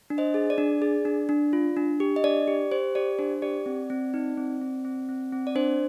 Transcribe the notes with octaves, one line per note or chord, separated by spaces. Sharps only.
D4
C5 D#5
G#4
D5
D4
G#4
D4
D4
F4
D4
G4
D#5
D4 D5
G4
G4 C5
G4 D5
D4 C5
G4 D5
C4
C4
D#4
C4
C4
C4
C4
C4
D5
D4 C5